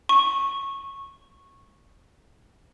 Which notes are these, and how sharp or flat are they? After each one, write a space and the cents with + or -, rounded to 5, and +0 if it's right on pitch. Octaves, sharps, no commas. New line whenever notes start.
C#6 -15